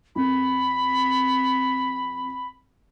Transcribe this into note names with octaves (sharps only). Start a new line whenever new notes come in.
F2 B5